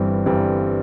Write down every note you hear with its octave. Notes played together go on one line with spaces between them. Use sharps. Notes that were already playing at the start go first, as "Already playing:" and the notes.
Already playing: G1 G2 E3 G3 C4
G1 G2 E3 G3 C4